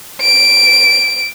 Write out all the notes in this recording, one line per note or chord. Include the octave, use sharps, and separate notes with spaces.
D7